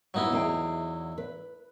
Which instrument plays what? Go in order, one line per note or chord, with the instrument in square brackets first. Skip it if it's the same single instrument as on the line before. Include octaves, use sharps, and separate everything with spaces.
[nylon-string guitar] G2 B3 [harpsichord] F#3 D#4 E4
[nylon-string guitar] E2 G#4 G5
B4